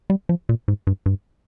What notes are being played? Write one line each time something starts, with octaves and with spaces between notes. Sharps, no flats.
G3
F3
A#2
G#2
G2
G2